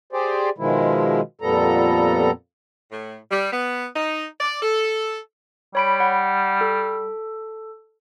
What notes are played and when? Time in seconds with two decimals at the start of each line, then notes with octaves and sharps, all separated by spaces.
0.13 G4 G#4 C5 D5
0.58 B2 D#3 F3 G#3 E4
1.41 F2 A#2 G3 B3 A4 A#5
2.92 A2
3.31 G3
3.52 B3
3.95 D#4
4.41 D5
4.62 A4
5.75 G3 C#5 B5 D7
6.00 F#5
6.61 A4